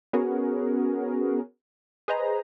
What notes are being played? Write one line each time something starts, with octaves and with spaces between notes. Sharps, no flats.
B3 C#4 F#4 G#4 A#4
G#4 B4 C5 D#5 A#5